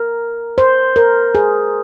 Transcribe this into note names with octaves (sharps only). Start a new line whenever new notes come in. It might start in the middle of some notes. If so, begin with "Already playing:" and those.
Already playing: A#4
C5
A#4
G#4